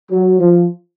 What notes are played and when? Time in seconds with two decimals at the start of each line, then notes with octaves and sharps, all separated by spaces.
0.11 F#3
0.40 F3